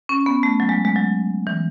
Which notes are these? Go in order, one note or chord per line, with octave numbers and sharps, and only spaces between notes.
C#4
B3
A3
F#3
G#3
G#3
F#3
E3